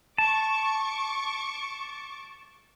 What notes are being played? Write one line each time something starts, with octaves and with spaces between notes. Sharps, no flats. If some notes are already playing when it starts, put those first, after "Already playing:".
A5 C#6 D6